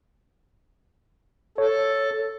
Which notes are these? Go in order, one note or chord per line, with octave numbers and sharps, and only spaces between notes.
A4 C#5